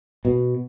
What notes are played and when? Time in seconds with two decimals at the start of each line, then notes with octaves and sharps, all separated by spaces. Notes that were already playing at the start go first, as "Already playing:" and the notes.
0.25 B2